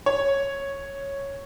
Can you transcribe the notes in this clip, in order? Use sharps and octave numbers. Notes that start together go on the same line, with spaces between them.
C#5